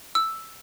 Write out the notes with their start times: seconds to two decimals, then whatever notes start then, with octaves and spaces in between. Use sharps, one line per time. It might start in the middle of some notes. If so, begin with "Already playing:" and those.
0.15 E6